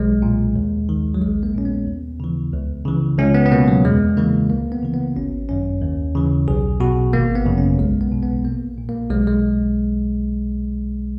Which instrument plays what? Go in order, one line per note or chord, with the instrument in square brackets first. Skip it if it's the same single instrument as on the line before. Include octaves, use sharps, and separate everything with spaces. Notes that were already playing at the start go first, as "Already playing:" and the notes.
Already playing: [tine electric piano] B1 G#3
A#2
D#2
D#3
F#3
A#1 G#3
A#3
A#2 C#4
B3
D#2
C#3 E3
C#2
C#3 E3
C#2 C#4
B3
B3
B2 A#3
F#3
E2 G#3
C#3 E3 A#3
C#2 A#3
B3
C#3 E3
B3
G#1 C#4
F#2 D#3 C#4
D#2
C#3 E3
B1 G#4
B2 F#4
G#1 A#3
B3
F#2 C#3
C#4
B1 G#3
B3
B2
B3
A#1 A#3
A#2
A#3
B1 G#3
G#3